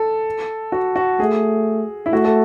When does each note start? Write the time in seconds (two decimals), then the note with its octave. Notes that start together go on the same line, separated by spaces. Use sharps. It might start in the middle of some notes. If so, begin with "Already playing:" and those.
Already playing: A4
0.72 F#4
0.96 F#4
1.20 A3 G#4
2.06 E4
2.13 A3 F#4
2.25 A4